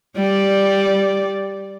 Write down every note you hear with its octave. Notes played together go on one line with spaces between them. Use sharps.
G3 D5